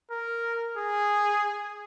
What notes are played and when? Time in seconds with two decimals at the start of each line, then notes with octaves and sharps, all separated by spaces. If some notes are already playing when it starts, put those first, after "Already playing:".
0.10 A#4
0.77 G#4